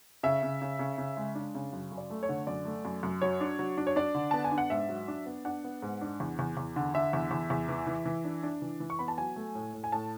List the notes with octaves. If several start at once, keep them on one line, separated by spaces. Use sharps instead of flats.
C#3 E5
C#3
C#3
C#3
C#3
G#3
D4
C#3
F#2
F#2
D5
A3
C#5
D3
F#2 D5
A3
F#2
F#2
F#3 C#5
D4
F#3
D4
C#5
D4 D5
D3
B3 A5
G#5
D4
F#5
G#2 E5
F#3
D4
B3
D4 F#5
B3
G#2
D4
E2
E2
E2
D3
D3 E5
E2
E2
E2
E3
E3
E3
D4
D4
E3
E3
C#6
B3 B5
A5
F#3 G#5
A3
A2
A2
G#5
A2 A5